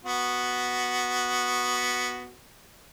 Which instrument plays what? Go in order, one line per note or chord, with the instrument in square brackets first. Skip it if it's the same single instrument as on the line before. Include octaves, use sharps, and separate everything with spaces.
[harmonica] B3 F#4